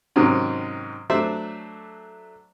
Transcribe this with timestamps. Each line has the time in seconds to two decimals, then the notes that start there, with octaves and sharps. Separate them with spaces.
0.16 G#2 C3 D#3 F#3 C4 C#4
1.10 F#3 A3 D4 C5 D5 E5